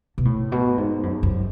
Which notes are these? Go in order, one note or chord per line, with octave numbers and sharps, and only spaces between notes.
B2
A2
B2
G#2
F#2
F#2